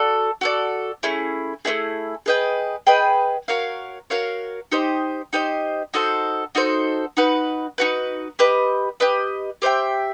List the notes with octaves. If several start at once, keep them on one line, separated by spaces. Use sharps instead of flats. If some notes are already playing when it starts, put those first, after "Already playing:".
Already playing: F#4 A4 D5
F#4 A4 D5
A3 C#4 E4 G#4
A3 C#4 E4 G#4
G#4 B4 D#5 G5
G#4 B4 D#5 G5
F#4 A#4 C#5 F5
F#4 A#4 C#5 F5
D#4 G4 C5 D#5
D#4 G4 C5 D#5
D#4 F#4 A4 C5
D#4 F#4 A4 C5
D#4 F#4 B4
D#4 F#4 B4
G4 B4 D#5
G4 B4 D#5
G4 C5 E5 G5